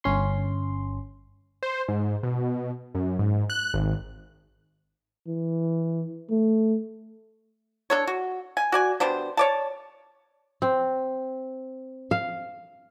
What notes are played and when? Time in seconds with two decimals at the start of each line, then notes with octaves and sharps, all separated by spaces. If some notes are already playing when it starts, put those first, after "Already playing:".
0.04 G1 C#4 C6
1.63 C5
1.88 G#2
2.23 B2
2.95 F#2
3.19 G#2
3.50 F#6
3.74 G#1
5.27 E3
6.30 A3
7.90 D4 A4 C#5
8.07 F#4
8.57 G#5
8.72 F#4 D5 G#5
9.00 B2 G3 D4 C5
9.37 C#5 D5 A5
10.62 C4
12.11 F5